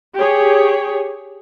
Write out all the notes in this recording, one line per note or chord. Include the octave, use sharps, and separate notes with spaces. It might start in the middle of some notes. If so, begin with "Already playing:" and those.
G4 G#4 C#5